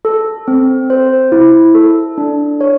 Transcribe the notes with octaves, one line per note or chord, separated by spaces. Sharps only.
A4
C4
C5
E4
A4
D4
C#5